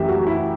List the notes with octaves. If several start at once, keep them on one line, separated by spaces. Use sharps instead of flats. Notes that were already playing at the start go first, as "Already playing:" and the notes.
Already playing: F#2 E3 A3 G4 E5
F#4
E4